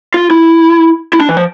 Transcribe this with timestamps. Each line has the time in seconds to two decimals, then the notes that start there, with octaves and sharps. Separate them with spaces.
0.14 F4
0.30 E4
1.13 E4
1.20 D4
1.29 E3
1.37 F3